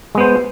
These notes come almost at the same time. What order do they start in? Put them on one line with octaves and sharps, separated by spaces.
G#3 B3 C5